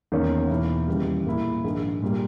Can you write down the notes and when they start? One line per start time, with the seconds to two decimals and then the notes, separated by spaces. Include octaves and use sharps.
0.12 E2 D#3 A#3 C#4
0.50 E2 B2 A#3 E4
0.88 D#2 C#3 E3 G3
1.26 A#2 A#3 E4
1.64 A#1 G#2 D#3
2.02 A#2 G3 A#3